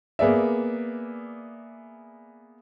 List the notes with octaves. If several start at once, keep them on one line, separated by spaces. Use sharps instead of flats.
A#3 B3 G#4 D5 E5